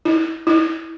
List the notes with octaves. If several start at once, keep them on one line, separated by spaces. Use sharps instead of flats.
E4
E4